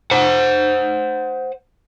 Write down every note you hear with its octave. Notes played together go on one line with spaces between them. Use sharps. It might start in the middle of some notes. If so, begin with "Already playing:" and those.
C5 F#5